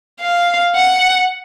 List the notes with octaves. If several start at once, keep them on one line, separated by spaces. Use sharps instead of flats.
F5
F#5